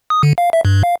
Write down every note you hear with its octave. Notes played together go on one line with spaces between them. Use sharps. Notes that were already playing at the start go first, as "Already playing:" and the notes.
D#6
D3
F5
E5
G2
F5